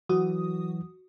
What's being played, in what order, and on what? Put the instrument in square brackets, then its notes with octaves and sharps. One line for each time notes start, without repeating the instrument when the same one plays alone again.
[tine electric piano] E3 F#3 [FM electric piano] F#4 D#6